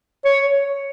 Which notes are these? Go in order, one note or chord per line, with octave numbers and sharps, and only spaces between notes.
C#5